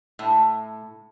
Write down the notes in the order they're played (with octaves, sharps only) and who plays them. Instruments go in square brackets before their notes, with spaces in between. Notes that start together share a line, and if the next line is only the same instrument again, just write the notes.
[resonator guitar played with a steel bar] A2